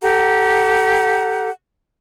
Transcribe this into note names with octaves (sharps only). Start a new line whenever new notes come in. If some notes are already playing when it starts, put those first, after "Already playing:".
G4 A4 F#5 A#5